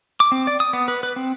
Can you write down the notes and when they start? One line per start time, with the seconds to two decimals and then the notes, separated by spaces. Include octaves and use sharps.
0.20 D6
0.32 C4
0.47 D5
0.60 D#6
0.73 B3
0.88 B4
1.03 B4
1.16 C4